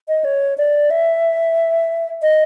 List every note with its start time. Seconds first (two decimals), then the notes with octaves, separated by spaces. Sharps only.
0.08 D#5
0.24 C#5
0.58 D5
0.90 E5
2.22 D#5